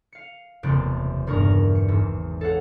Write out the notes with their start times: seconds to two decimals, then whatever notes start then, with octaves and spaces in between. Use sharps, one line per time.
0.13 F5 C#7
0.63 F#1 E2 C3 A3 F#6 D7
1.27 D#1 E2 G2 A#4 C#6 F6
1.75 C#7
1.88 G#1 G#2 E6
2.41 A4 C#5 F5 F#5